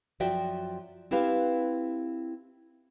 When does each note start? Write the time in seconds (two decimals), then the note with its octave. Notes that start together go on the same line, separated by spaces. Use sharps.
0.20 F#2 F3 F#4 D5 E5 G5
1.11 C4 E4 G4 B4 F5